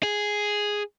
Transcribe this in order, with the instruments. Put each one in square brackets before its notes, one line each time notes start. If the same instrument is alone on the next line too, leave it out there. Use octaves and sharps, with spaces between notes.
[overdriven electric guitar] G#4